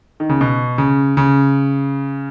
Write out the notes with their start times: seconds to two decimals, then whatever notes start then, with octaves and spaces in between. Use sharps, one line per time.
0.20 D#3
0.29 C#3
0.41 B2
0.78 C#3
1.17 C#3